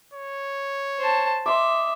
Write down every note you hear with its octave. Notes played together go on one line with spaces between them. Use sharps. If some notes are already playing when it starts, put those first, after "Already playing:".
C#5
C5 A5
D#5 E5 C6 D6